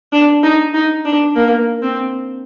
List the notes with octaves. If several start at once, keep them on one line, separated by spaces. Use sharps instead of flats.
D4
D#4
D#4
D4
A#3
C4